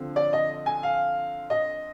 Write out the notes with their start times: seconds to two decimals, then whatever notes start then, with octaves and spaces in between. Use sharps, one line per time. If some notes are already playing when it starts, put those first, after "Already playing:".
Already playing: D3 F3 C4
0.16 D5
0.33 D#5
0.66 G#5
0.83 F5
1.50 D#5